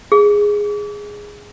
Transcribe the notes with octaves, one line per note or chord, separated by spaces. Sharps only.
G#4